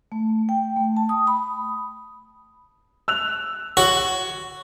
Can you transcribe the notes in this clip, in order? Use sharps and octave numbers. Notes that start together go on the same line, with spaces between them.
A3
G5
A3
A5
D#6
B5
E6 F#6 F7
F#4 C#5 F#7